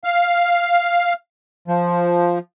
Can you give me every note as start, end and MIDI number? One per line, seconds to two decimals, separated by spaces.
0.04 1.13 77
1.68 2.39 53